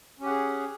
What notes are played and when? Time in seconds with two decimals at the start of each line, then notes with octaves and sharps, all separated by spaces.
0.20 C#4
0.23 G4
0.26 F#5
0.29 G#4